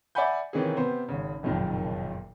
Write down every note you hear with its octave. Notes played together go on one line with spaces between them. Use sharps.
D5 E5 F#5 G#5 B5 G6
C3 D#3 E3 A#3 C#4 G#4
C3 B3 C5
G#1 C#3
F#1 B1 F2 A#2 D#3